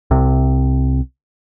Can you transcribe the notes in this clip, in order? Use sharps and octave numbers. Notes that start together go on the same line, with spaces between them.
C2 C3